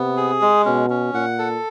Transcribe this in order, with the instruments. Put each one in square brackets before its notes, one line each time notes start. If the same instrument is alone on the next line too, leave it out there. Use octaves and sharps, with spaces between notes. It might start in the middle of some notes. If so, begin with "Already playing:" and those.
Already playing: [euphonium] C3 [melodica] B3
[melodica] G#4
G#3
[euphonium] B2 [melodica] C#4
[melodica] C#4
[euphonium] A#2 [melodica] F#5
[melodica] A4